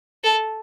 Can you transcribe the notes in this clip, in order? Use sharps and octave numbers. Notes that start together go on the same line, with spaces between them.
A4